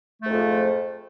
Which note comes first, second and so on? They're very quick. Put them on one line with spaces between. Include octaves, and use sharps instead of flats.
A3 G#2 F2 F3